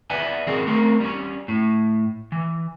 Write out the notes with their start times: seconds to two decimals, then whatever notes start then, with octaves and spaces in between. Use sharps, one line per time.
0.10 B4 D5 E5 F#5 G#5
0.47 D#3 F#3 C4 C#4 G#4 A#4
0.67 A3 C4 C#4 A#4
1.00 G3 C#4
1.48 A2
2.32 E3